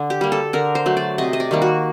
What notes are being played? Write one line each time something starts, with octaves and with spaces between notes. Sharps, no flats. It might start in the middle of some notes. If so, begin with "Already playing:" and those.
Already playing: D3
G4
G3 A#3
A4
D3 A#4
C5
F#3 A3
D5
C3 D#5
D#5
D5
D#3 G3 A#3
F#4